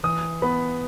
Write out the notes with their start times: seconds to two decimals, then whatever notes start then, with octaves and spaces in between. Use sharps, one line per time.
0.03 E3 D#6
0.42 B3 B5